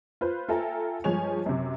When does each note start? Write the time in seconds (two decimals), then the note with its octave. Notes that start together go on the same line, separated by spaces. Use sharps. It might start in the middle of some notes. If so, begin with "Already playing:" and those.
0.21 F4 B4 C5
0.49 F4 A4 E5 G5 G#5 A#5
1.04 G2 F3 G#3 C#5 G#5 F7
1.46 F#2 C3